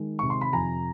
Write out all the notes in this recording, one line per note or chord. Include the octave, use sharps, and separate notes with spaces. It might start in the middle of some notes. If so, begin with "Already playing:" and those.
Already playing: D#3 G#3
C3 C#6
C6
B5
F2 G#5 A#5